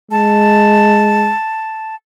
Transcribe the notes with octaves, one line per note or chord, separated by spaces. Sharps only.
G#3 A5